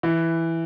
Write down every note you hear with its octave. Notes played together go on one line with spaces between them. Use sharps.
E3